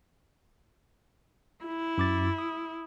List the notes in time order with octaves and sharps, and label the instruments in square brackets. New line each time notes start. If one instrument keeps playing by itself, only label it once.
[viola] E4
[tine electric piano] F#2 D6 A6
D#6